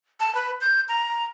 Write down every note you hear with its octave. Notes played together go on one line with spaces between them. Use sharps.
A5
B4
G6
A#5